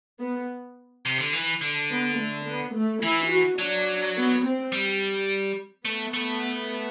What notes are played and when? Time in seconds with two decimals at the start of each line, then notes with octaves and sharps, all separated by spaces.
0.20 B3
1.05 C3
1.19 D3
1.33 E3
1.61 D3
1.90 B3
2.18 A3
2.46 B3
2.74 A3
3.03 E3 E4
3.31 F#4
3.59 F#3 D4
4.16 B3
4.44 C4
4.72 G3
5.85 A3 B3
6.14 A3